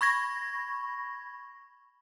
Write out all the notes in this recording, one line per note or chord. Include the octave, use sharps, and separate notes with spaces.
B5 C#6 G#6 A#6